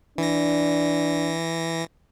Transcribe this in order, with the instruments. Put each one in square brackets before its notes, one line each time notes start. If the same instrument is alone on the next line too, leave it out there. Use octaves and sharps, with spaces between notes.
[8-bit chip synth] E3 A#6 [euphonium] D4